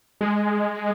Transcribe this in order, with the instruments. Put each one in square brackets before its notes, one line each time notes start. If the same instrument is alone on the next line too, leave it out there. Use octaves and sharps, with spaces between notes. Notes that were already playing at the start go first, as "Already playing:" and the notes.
[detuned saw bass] G#3